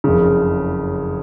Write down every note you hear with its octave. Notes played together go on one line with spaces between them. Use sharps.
F#1 F2 C#3